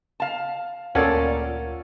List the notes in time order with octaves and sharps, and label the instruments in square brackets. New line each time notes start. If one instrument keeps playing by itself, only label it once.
[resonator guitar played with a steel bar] F5 A5
[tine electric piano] D2 [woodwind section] A#2 [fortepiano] C#4 A4 D5 [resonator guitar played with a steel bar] F5 F#5